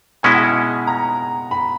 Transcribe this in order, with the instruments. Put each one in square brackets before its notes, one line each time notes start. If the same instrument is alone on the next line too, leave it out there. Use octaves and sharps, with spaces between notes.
[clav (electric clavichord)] B2 G#3 C#4 E4 [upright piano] G#5
[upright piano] F#5
G#5
A#5
B5